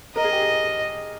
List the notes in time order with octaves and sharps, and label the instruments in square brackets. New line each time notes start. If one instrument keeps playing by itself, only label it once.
[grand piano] A#4 [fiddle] D#5
[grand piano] G#4
G4
G#4